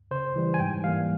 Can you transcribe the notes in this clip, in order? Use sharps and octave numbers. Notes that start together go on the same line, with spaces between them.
C#3 C5
E3 G3
G#5
G#2 G5
E3 G3 A#3 F5